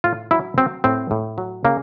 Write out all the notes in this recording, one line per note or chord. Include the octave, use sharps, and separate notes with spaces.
A2 F4
F#3 E4
F#3 C4
A2 C4
A2
F#3
C#3 A#3